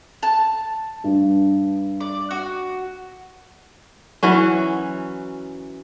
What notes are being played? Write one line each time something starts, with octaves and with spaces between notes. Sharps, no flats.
A5
G2
D5
F#4
E3 F#3 C#4